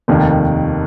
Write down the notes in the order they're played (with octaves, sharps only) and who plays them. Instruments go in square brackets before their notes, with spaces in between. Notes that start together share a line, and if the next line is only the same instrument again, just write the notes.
[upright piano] F1 D#2 D#3